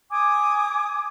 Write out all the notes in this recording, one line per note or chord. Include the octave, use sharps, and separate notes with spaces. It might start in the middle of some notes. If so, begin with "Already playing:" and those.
G#5 D6 D#6